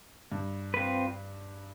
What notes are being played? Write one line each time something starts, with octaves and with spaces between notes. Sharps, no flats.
G2
C4 F4 B4